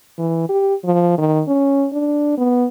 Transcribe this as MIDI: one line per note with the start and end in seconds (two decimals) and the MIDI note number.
0.18 0.45 52
0.49 0.74 67
0.85 1.15 53
1.18 1.43 51
1.48 1.87 61
1.93 2.38 62
2.38 2.67 59